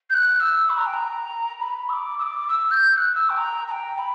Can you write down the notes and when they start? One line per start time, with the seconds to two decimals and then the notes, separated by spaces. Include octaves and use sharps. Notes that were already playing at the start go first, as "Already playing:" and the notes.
0.10 G6
0.14 F#6
0.40 E6
0.69 B5
0.77 A#5
0.86 G5
0.93 A#5
1.59 B5
1.89 E6
1.93 D6
2.18 E6
2.22 D6
2.48 E6
2.70 G6
2.93 G6
2.97 F#6
3.14 E6
3.29 G5
3.37 A#5
3.67 A#5
3.71 G5
3.98 B5